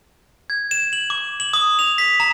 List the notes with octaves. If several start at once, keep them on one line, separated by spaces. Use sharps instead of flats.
G#6
E7
F#7
D6
F#7
D#6
F7
B6
A#5